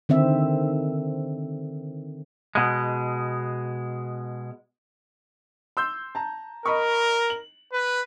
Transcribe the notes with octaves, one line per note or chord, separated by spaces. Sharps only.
D3 D#3 C4 E5
B2 G#3
C6 E6 G6
A5 A#5
A#4 D#5 B5 C#6
F#7
B4